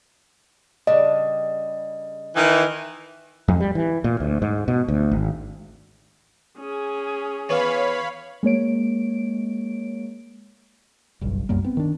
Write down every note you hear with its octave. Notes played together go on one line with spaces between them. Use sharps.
C#3 G3 D4 D#5
D#3 E3
F2
G3
E3
A#2
D2
G#2
B2
D2
G#1
C#4 G#4
E3 B3 C#5 F5 B5
G#3 A#3 C#5 D7
F#1 B1 G2
C2 F#2 G3 A#3
B3 C4
D#3 D4